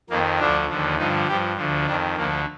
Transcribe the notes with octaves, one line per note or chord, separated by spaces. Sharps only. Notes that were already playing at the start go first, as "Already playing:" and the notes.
F2 D#3 A#3
D2 D3 F3 D4
D#2 D3 F3
G2 D3 F3 D#4
G2 F3 G4
D2 D3 F3
F2 D#3 D4
D2 D3 F3 A#3